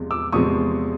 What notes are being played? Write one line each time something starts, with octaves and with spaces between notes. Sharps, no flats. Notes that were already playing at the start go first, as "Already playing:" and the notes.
Already playing: E2 C3 F3 G#3
D6 E6
E2 C3 F3 G#3 C#6 D#6